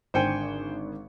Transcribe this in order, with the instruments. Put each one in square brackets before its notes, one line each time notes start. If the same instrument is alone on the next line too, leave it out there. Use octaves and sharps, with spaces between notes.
[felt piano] G#1 D3 C#7 [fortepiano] C5 G5 G#5